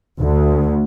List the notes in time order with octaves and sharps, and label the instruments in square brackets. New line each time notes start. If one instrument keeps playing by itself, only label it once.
[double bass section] D2